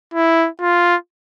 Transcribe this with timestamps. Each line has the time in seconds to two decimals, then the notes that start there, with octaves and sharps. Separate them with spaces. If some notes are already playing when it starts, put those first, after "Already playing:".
0.14 E4
0.62 F4